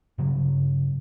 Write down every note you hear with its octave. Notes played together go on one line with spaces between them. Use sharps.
G2 C#3 F#3